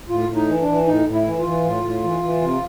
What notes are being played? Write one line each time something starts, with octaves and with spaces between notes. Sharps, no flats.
A2 F4
A2
D#4
E3
D4
E3
A2 D#4
A2
E4
E3
F4
E3
A2
A2
E3
E3
C3